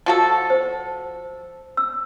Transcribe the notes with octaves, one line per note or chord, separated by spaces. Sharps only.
F3 F#4 A4
C5
E6